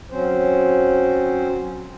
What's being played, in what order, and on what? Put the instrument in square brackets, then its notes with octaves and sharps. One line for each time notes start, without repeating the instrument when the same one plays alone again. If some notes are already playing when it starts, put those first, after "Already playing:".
[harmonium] F#3 C4 C#4 C5